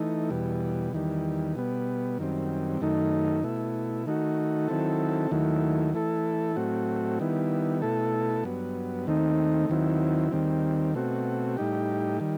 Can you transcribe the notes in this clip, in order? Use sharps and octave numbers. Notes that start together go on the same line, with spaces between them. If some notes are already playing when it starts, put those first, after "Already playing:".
Already playing: E3 A3 D#4
E2 B2 G3
E2 D#3 G3
B2 G3 B3
F#2 D#3 G3 C4
F#2 D#3 A3 D#4
B2 A3 E4
D#3 A3 D#4 F#4
D#3 F#3 C4 E4 A4
D#2 D#3 F#3 A3 E4
E3 A3 E4 A4
A2 F#3 A3 C4 F#4
D#3 G3 B3 E4
B2 A3 E4 A4
G2 F#3 B3
D#2 D#3 A3 C4 D#4
D#2 D#3 F#3 C4 E4
D#2 D#3 G3 C4
B2 A3 C4 F#4
A2 G3 D#4 G4
D#3 G3